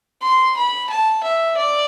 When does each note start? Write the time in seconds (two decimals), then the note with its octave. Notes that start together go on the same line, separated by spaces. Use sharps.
0.22 C6
0.57 B5
0.90 A5
1.23 E5
1.57 D5